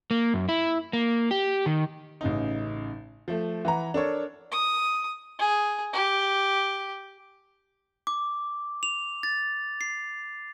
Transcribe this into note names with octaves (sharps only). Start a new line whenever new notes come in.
A#3
F#2
E4
A#3
G4
D#3
A1 C#3 D#4
F3 A3
E3 F#5 A#5
D4 A4 A#4 C#5
D#6
G#4
G4
D6
F7
A6
C7